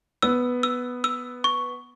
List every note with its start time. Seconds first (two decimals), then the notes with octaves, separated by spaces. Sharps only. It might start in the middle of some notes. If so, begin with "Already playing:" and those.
0.22 B3 E6
0.63 E6
1.04 E6
1.44 C#6